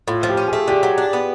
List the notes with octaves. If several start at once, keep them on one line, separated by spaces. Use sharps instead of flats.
A2 F4
F3
G4
C#4
G#4
A3
D3 G4
F#3
D4
B3